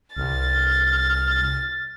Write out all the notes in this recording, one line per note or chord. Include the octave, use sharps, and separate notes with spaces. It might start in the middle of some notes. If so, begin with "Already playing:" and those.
C2 F6 A6